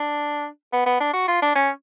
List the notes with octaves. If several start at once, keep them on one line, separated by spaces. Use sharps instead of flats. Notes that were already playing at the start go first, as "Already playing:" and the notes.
Already playing: D4
B3
B3
D4
F#4
F4
D4
C#4